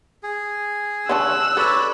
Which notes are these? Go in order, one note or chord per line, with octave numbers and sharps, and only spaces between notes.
G#4
D3 C#4 A5 E6 F#6
A4 B4 C#5 D5